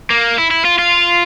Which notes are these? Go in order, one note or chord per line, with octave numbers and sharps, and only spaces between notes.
A#3
E4
E4
F4
F4